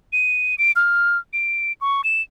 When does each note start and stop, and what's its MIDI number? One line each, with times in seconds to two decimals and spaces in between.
0.13 0.55 99
0.58 0.72 98
0.76 1.18 89
1.33 1.73 98
1.81 2.02 85
2.04 2.22 100